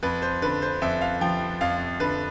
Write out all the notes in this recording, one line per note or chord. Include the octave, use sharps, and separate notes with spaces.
F2 B4
C5
D3 B4
C5
F2 E5
F5
F3 G5
F2 F5
D3 B4